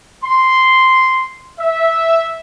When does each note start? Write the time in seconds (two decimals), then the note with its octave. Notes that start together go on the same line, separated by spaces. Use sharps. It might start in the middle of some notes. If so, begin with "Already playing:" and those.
0.24 C6
1.59 E5